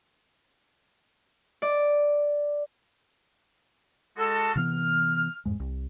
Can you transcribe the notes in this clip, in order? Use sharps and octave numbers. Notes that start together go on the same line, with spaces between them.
D5
G#3 F#4 A4
C3 E3 B3 F6
F2 G#2 G#3
C2